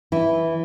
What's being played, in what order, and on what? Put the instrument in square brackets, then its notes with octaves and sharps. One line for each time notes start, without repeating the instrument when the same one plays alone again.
[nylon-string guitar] E3 E4